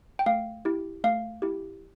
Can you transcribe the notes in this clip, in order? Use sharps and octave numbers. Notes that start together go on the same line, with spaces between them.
G5
A3 F5
E4 G4
A3 F5
E4 G4